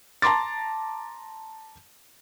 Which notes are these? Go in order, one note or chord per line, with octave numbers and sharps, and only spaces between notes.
A5 A#5 C6 D6 A6